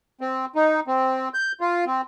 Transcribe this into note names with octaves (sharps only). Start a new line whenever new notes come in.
C4
D#4
C4
G6
F4
C4